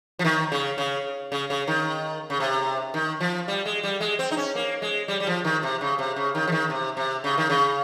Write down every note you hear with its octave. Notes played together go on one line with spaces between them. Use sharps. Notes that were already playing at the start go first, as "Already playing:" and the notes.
F3
D#3
C#3
C#3
C#3
C#3
D#3
C#3
C3
D#3
F3
G3
G#3
G3
G#3
C4
D#4
C#4
A#3
G#3
G3
G3
F3
D#3
C3
C#3
C3
C#3
D#3
F3
D#3
C3
C3
C#3
D#3
C#3